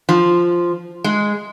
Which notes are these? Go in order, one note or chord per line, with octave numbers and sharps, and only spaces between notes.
F3
G#3